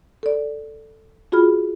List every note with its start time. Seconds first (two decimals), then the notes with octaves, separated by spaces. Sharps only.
0.23 A4 D5
1.32 F4 F#4 G#4 B5 F6